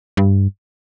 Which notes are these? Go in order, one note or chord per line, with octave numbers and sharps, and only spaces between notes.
G2